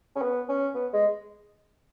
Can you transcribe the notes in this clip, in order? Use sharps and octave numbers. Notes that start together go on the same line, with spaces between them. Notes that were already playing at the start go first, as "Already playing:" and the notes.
C#4
B3
C#4
B3
G#3